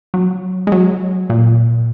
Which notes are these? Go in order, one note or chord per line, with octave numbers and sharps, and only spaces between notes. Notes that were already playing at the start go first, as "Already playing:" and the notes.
F#3
G#3
F#3
A#2